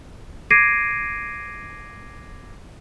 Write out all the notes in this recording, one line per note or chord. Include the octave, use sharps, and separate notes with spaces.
D6 G#6 A#6 C7 D7 D#7